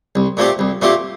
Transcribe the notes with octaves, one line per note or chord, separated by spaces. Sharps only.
C2
A#2 A3 C4 G4
C2
A#2 A3 C4 G4